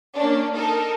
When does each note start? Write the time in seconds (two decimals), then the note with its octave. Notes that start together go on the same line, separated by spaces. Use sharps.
0.15 A#3 C#4 D4
0.54 D#4 A4 A#4